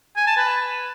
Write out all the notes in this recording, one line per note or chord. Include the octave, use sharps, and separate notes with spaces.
G#5
A5
B4